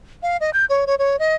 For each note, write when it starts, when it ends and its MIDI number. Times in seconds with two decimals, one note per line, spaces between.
0.23 0.37 77
0.41 0.50 75
0.53 0.65 91
0.69 0.85 73
0.87 0.95 73
0.99 1.19 73
1.19 1.35 75